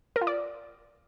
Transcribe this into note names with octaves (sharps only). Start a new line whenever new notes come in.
A#4
F4
D5